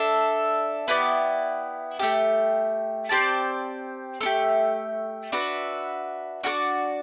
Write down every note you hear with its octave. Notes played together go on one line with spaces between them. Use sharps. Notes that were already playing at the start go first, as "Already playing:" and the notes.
Already playing: D4 A4 E5
B3 E4 G4 D5
A3 D4 G4
C4 G4 D5 A5
A3 D4
G4
D4 F#4 B4 E5
D4 F#4 A4 D5